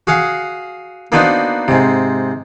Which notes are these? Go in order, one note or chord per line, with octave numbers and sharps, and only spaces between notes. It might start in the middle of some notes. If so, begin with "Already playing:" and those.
F#4 G#4 F5 F#5
A#3 B3 D4 D#4 F#4 C5
G#2 C3